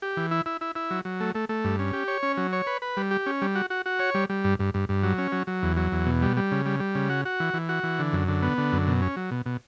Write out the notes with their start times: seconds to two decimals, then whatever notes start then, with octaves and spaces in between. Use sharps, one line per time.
0.02 G4
0.17 E3
0.31 E4
0.46 E4
0.61 E4
0.75 E4
0.91 F#3
1.05 F#3
1.20 A3
1.35 A3
1.49 A3
1.64 G2
1.79 C#4
1.93 G4
2.08 C#5
2.23 C#4
2.37 F#3
2.53 C#5
2.67 B4
2.82 B4
2.97 G3
3.11 G4
3.26 C#4
3.42 G3
3.55 F#4
3.70 F#4
3.86 F#4
3.99 C#5
4.14 G3
4.29 G3
4.44 G2
4.59 G2
4.74 G2
4.89 G2
5.03 F#3
5.18 C#4
5.32 F#3
5.47 F#3
5.63 E2
5.77 F#3
5.92 E2
6.06 B2
6.22 G3
6.37 G3
6.51 C#3
6.66 G3
6.80 G3
6.95 C#3
7.10 F#4
7.25 F#4
7.40 E3
7.54 E3
7.69 F#4
7.83 E3
7.99 D3
8.13 F#2
8.28 D3
8.42 B3
8.58 D3
8.72 F#2
8.87 B2
9.02 C#4
9.16 F#3
9.31 B2
9.46 B2